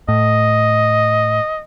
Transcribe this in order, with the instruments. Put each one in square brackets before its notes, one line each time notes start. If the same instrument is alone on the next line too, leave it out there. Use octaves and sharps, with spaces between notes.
[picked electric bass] A2 [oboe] D#5